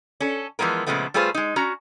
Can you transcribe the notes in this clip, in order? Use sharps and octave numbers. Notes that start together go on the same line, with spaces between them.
C#4 A4
E3 F3 G#3 B3 A#4
A#2 C#3 F3 G#3 A3 B3
G3 A3 F4 G#4 B4 C5
G#3 D#4
C#4 F#4 A#5